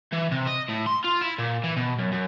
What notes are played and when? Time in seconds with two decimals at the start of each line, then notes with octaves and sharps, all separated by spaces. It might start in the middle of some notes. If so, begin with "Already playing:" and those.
0.13 E3
0.31 C3
0.47 D#5
0.68 A2
0.86 C6
1.04 F4
1.21 E4
1.39 A#2
1.64 E3
1.76 B2
1.99 F#2
2.12 F#2